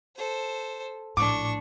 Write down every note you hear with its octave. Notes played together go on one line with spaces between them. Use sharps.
A4 C5
A#1 A2 D4 C#6 D6